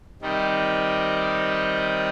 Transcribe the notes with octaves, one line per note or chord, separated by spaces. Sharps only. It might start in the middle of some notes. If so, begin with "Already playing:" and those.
C3 D#3 G3 D#4